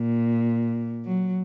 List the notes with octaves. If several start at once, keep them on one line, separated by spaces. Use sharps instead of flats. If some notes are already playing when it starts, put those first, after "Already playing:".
Already playing: A#2
F#3